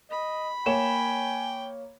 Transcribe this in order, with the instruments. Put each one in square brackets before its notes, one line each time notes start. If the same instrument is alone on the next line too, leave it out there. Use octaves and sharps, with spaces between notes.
[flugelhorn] D#5 [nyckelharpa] B5
[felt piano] A#3 C#5 E7 [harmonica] G5 [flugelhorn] G#5